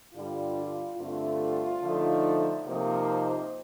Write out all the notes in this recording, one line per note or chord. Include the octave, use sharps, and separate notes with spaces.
G2 D3 G3 D4 F4
F4
G2 D3 A3 C4 F4
D3 F3 A3 D#4
C3 F3 A#3 D#4 C5